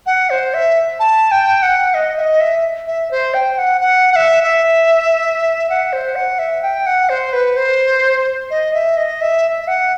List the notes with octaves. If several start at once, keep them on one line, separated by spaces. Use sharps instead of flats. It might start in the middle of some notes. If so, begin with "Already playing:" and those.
F#5
C5
E5
A5
G5
F#5
D#5
E5
D#5
E5
E5
C5
G5
F#5
F#5
F#5
E5
E5
F#5
C5
F#5
E5
G5
F#5
C5
B4
C5
D#5
E5
D#5
E5
E5
F#5